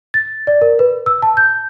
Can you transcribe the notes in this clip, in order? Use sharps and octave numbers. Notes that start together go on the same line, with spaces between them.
A6
D5
A#4
B4
E6
A5
G6